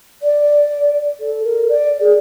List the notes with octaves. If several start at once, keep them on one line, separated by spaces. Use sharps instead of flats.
D5
A4
A#4
D5
G#4